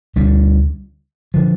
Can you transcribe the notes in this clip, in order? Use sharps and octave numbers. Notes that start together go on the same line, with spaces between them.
D2 D3 G3
D3 F3